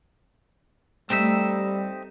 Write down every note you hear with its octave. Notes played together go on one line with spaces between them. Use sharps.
G3 A3 C4 D#4 E5